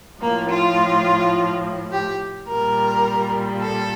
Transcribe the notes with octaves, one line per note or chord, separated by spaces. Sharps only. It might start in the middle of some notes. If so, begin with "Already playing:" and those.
A2 F3 A#3
F4
G4
A#2 G3 A#4
A4